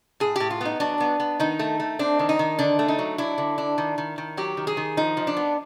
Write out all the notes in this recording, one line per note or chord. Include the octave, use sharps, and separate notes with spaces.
A2 G#4
A2 G4
F4
B3 D#4
F#3 D4
B3
B3
D#3 D#4
A3
A3
C4 D4
D#3
D#4
D#3
D3 D4
A3
D#4
F#3
D4 E4
D3
D4
D#3
D#3
D#3
F#3 G4
D#3
G#4
D#3
F3 D#4
F3
D4
B3